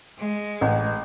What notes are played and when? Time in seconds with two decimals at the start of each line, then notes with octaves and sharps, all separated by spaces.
0.17 G#3
0.61 A1